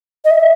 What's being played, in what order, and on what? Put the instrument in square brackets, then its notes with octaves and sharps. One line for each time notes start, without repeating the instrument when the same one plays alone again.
[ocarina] D#5
E5